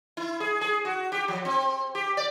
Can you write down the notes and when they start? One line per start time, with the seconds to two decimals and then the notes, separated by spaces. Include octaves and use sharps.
0.17 E4
0.40 G#4
0.61 G#4
0.85 F#4
1.12 G4
1.28 F3
1.45 C4
1.95 G4
2.17 D5